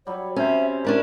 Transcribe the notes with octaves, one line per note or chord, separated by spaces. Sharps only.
F#3 G3 C#5
C3 C#4 C5 E5
C#4 D4 E4 A#4